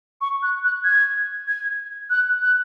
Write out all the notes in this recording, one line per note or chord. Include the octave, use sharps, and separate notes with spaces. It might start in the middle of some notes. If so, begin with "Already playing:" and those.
C#6
F#6
F#6
G#6
G#6
F#6
F#6